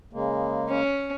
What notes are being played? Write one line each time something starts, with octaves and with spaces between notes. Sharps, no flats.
C#3 G#3 A#3
C#4